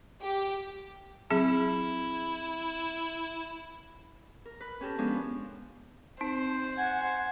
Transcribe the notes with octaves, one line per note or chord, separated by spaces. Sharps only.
G4
F#3 C4 E4 G#4
A#4
B4
C#4 G4 A4 A#4
F3 G#3 B3 C#4 D4
C4 D#4 C5
F#5 G#5